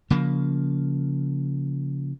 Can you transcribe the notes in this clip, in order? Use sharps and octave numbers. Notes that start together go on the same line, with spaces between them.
C#3 F3 A#3